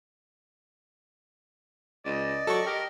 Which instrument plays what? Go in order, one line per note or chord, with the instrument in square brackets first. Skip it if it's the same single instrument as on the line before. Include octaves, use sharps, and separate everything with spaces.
[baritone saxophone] C#2 [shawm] D5 [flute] D#5
[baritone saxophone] F#3 [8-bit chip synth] A4 C#6
[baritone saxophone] G4 [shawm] A#4